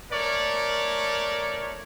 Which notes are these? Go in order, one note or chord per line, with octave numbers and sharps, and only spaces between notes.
A3 A#4 C#5 D5